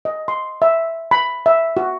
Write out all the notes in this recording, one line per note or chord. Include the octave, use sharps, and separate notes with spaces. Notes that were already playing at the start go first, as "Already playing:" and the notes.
D#5
C6
E5
B5
E5
F#4